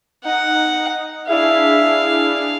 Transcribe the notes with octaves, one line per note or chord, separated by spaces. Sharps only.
D#4 F#5
D4 E4 G#4 E5 F5